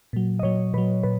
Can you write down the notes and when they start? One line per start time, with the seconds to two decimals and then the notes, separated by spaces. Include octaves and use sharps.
0.13 A#2 F#3
0.39 D#5
0.43 A#2 F#3 C#5
0.73 A#2 F#3 B4
1.03 A#2 B4